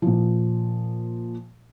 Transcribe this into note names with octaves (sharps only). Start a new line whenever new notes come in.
A#2 F3